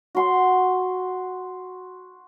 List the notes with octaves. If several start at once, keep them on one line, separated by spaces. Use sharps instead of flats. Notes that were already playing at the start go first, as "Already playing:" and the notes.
F#4 C6